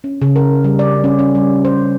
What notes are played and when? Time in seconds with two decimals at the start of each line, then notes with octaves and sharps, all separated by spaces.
0.04 C#4
0.22 C#3
0.36 A#4
0.64 G3
0.79 D5
1.04 C#4
1.19 C#4
1.35 G3
1.65 C5